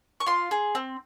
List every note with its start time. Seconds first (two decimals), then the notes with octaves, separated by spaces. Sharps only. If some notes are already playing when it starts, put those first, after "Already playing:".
0.20 C#6
0.26 F4 C6
0.51 G#4
0.75 C4